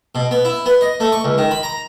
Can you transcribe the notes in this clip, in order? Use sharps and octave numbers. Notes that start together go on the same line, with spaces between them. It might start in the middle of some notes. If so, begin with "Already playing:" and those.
B2
B3
E4
B3
D#5
A3
C#6
C#2
D#3
B5
A#5